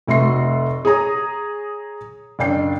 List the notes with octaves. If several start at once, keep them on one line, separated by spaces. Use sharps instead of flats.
F1 A3 F#4 C6 C7
G#4 C#5 A#5 D#6
F#1 D4 G5 C7